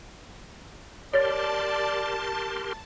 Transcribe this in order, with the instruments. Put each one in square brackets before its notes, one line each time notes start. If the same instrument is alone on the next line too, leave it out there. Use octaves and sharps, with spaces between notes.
[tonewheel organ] G4 A#4 C6 [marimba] C#5 A6 [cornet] D5 [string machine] A5